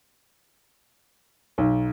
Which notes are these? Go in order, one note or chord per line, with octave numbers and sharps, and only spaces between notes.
B1